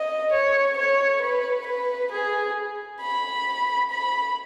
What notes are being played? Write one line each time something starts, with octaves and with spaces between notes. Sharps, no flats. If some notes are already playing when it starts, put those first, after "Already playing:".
Already playing: D#5
C#5
C#5
B4
B4
G#4
B5
B5